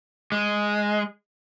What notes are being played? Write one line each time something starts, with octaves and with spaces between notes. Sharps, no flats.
G#3